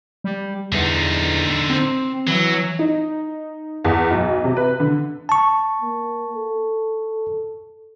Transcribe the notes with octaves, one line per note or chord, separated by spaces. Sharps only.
G3
E2 D3 D#4
C4
E3 F#3
D#4
E2
B1
C3
B4
D3
A5 C#6
A#3
A4